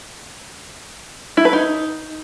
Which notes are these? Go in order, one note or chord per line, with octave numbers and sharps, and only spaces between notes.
E4
B4
D#4